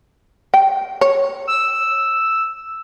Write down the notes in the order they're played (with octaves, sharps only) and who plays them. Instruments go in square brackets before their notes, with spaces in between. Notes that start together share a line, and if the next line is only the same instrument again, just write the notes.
[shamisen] G5
C#5
[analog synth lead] E6